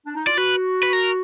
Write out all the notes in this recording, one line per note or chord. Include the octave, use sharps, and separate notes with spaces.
D4
D#4
F4 D5
F#4 B4
B4
A#4